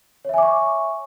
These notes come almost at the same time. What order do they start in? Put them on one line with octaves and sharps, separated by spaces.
C#5 E5 G#5 D6 C#6